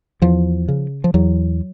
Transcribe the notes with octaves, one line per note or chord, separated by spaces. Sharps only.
E2 F3
C#3
F3
E2 F#3